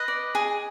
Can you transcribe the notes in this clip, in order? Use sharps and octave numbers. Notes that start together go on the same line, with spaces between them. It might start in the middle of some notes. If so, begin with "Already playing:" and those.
Already playing: B4 D#5
D5
G#4